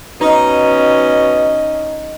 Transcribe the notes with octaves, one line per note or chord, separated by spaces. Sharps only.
B2 C#4 D#4 D#5